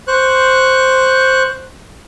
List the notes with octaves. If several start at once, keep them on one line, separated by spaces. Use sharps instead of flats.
C5 C#6 F#6